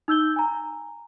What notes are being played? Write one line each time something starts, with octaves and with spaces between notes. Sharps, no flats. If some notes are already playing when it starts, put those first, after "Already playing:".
D#4 E6 G6 G7
G#5 A#5